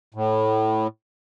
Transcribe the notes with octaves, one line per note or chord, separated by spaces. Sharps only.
A2